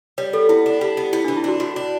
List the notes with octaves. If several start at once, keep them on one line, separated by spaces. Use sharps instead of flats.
G3 C#5
B3 A4
B3 E4
D4
G3
B3
B3 E4
E3 D4
E4
D4 F#4
A2 F#4
D4